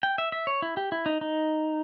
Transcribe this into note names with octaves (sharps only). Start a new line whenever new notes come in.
G5
E5
E5
C#5
E4
G4
E4
D#4
D#4